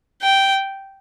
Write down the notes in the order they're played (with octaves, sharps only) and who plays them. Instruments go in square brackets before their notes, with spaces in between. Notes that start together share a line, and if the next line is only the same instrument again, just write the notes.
[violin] G5